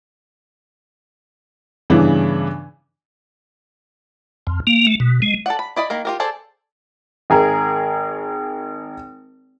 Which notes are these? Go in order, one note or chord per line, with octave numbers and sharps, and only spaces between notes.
G2 C#3 E3 B3 D4 E4
F2
A#3
A3
B2
G#3
A4 D5 F#5
B5
E4 D5 D#5 B5
D#3 A#3 A#4
F4 G4 A#4
G#4 A4 C5 D5
G#1 G#4 A#4